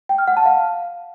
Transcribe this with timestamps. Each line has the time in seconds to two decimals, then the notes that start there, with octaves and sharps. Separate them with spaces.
0.09 G5
0.18 F6
0.28 F#5
0.37 A5
0.46 F5